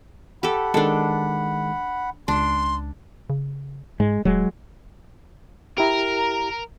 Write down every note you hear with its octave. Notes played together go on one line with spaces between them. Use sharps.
G4 A4 F#5 B5
D#3 G#3 D4 A4
C#2 D4 C6
C#3
G#2 G#3
D#1 F#3 G#3
E4 G4 A#4 A#5